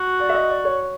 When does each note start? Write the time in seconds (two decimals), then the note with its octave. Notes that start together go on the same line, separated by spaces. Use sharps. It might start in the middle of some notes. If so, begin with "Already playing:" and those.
Already playing: F#4
0.20 D5
0.29 E5
0.34 D#5
0.49 D5
0.64 C#5